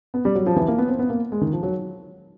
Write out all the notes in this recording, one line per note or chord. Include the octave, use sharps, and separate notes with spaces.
B3
G3
F#3
F3
E3
A#3
B3
C4
B3
A#3
G#3
D#3
F3
F#3